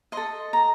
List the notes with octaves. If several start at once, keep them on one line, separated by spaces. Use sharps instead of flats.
A4 D#5 C6
A#5